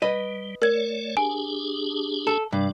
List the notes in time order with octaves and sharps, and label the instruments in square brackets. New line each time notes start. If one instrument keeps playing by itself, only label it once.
[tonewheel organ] G3 [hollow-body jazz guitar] B4 D#5
[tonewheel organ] A3 C#5 D5 [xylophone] A#4 G#6
[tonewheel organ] D4 G4 G#4 [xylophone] G#5
[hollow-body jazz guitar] A4
[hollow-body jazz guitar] G2 [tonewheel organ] C3 D4